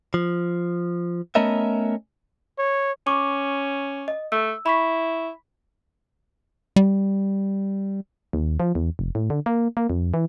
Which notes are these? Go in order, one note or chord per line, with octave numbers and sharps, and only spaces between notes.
F3
A3 B3 C#4 A#4 D#5 E5
C#5
C#4 C#6 D6
D#5
A3 E6
E4 B5 C#6 B6
G3
D#2
F3
E2
F1
A2
D3
A#3
A#3
F2
E3